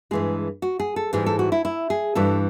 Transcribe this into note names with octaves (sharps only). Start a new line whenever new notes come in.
G2 E3 G#3 G#4
F#4
G#4
A4
G#2 E3 G3 G#4
A4
F#4
E4
E4
G#4
G2 E3 G3 A4